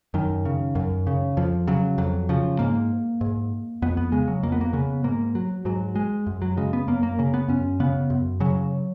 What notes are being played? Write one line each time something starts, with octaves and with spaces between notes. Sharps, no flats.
F#2 D#3
C#3
F#2
C#3
F2 F3
C#3 F#3
F2 F#3
C#3 F3
G#2 A#3
G#2
F2 B3
B3
C#3 G#3
F#3
F2 A#3
B3
A#3
C#3 B3
G#2 A#3
F#3
G#2 F#3
G#3
F#2
F#3
C#3 G#3
B3
F#2 A#3
A#3
C#3 A#3
B3
F#2 C#4
C#3 B3
F#2
C#3 F#3